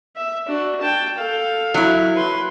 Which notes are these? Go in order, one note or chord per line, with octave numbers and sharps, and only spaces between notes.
E5
D4 F#4
G5 A5
A4 F5
F#3 E4
B4 C6